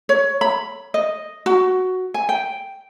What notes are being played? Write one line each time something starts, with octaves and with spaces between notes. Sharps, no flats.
C#5
B5
D#5
F#4
G#5
G5